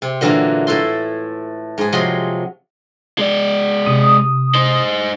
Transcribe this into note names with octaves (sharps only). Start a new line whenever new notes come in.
C3
A#2 D3 E3 F#3 A#3
A2 E4 A4 C6
G#2 G#4
C3 F3 F#3 D#5 B5 C6
G#3 D5
C3 D#6
D#4 C5